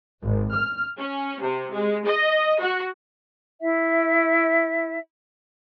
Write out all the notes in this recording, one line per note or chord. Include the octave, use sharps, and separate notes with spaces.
G#1
F6
C#4
C3
G#3
D#5
F#4
E4 E5